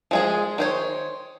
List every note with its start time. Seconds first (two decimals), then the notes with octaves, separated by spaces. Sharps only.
0.11 F3 G#3 G#4
0.58 D#3 C5 C#5